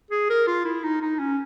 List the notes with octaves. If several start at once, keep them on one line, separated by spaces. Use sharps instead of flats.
G#4
A#4
F4
E4
D#4
D#4
C#4